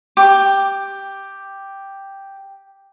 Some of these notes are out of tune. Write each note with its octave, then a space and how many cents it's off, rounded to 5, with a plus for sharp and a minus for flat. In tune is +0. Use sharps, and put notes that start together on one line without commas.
G4 +0 D6 +10